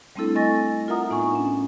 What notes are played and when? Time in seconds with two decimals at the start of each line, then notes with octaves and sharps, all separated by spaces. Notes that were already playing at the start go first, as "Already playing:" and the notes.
0.16 G3 A3 C4 D4 E4 A4
0.35 C4 D#5 G#5 C#6 A6 A#6
0.88 F4 A#4 E5 F#5 A#5 D#6
1.10 A2 B3 D#4 G#5 C#6
1.32 C#4 D4